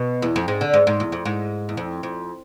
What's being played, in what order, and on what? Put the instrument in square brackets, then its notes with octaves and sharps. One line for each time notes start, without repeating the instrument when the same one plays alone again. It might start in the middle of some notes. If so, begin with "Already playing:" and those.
Already playing: [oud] B2
E2
F2
G#2
D3
G#2
G#2
E2
F2
G#2
E2
F2
F2